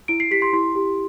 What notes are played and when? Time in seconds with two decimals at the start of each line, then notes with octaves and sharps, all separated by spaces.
0.08 E4 D7
0.20 C7
0.31 G4 B6
0.42 C6
0.53 E4 C6
0.76 G4